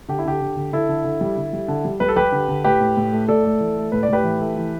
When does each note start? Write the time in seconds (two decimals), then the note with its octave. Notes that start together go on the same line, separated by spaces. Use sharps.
0.08 D3 G4
0.19 E4
0.25 D3 G4
0.41 D3
0.56 D3
0.73 D3 E4 A4
0.89 D3
1.04 D3
1.21 G3
1.37 D3
1.53 G3
1.68 D3
1.85 G3
2.00 G3 B4
2.08 A4
2.16 G3 G4 B4
2.32 D3
2.48 D3
2.64 A2 G4 B4
2.81 A2
2.97 A2
3.12 A3
3.28 A2 A4 D5
3.45 A3
3.60 E3
3.77 A3
3.92 A2 B4
4.03 D5
4.08 A2 G4 B4
4.24 E3
4.40 A3
4.56 E3